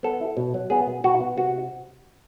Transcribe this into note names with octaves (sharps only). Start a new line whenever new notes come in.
B3 A4
E4
B2
F#3
B3 G#4
B2
B2 F#4
B3
C3 F#4